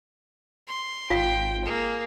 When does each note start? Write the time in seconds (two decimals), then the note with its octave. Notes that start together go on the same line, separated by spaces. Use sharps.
0.68 C6
1.10 G#1 F4 F5 G5
1.65 A#3 G#4